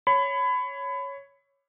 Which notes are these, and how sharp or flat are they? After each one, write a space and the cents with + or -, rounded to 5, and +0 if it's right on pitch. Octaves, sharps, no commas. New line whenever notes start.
C#5 +0 B5 +25